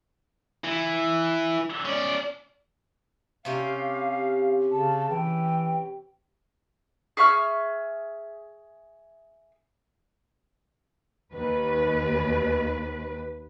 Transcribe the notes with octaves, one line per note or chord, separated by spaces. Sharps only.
E3
C#4 D5
C3 C#4 G4 F5
C#3 A5
E3 G5
G#4 E5 C#6 F6
D#2 B4